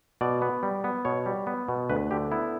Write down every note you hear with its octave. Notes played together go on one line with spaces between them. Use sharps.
B2 D5
B3
G3
B3
B2 C#5
G3
B3
B2
D2 B4
D3 G4
B3 E4